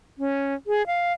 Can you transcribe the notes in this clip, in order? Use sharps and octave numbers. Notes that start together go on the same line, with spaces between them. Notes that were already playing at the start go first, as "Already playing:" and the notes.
C#4
G#4
F5